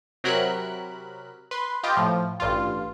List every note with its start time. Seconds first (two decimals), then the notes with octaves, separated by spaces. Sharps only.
0.24 C3 F#3 A#4 B5 F#6
1.51 B4 C6
1.84 F4 G4 D#5 G5
1.97 A2 F3
2.40 A1 G2 F4